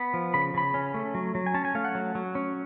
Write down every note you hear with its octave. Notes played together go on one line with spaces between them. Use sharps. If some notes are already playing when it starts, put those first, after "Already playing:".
Already playing: B3 B5
F3
C#3 B5
C#3 B5
C#4
A3
F#3
F#3
G#5
C#4 A5
G#5
A3 F5
F#5
F#3
F#3
C#4